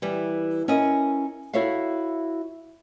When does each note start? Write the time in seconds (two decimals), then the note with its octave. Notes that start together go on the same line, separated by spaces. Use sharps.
0.02 E3 G3
0.68 C#4 E4 A#4 D#5
1.53 E4 F#4 A4 C#5 E5 F5